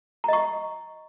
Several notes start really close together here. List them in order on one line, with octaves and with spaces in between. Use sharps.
A#5 D#5 C#6